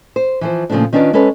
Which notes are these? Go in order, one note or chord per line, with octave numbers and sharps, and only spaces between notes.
C5
E3 F3 C5
A#2 C#3 F3 A3 C4 D4
D#3 C#4 D4 F4 B4 D5
G#3 C#4 A4 B4 C#5